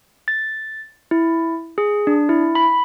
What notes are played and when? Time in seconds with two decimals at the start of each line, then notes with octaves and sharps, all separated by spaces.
0.28 A6
1.11 E4
1.78 G#4
2.07 D4
2.29 E4
2.55 B5